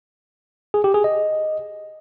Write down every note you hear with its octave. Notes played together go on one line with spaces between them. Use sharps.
G#4
G4
G#4
D#5